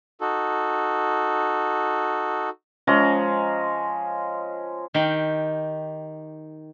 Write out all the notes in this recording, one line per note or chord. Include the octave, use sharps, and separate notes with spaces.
D#4 F#4 A4
F3 G#3 C#4 A#5
D#3 G4 G5